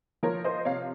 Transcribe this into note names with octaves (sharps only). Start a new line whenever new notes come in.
F3 A#4 C#5
C5 D#5
C3 C#5 F5